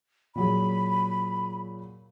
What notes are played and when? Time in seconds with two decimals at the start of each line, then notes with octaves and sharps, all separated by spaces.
0.35 A#2 F#3 G#4 B5